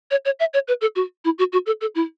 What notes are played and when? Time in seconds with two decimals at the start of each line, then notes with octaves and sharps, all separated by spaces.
0.11 C#5
0.25 C#5
0.40 E5
0.54 C#5
0.68 B4
0.81 A4
0.96 F#4
1.25 E4
1.39 F#4
1.53 F#4
1.66 A4
1.81 A4
1.95 E4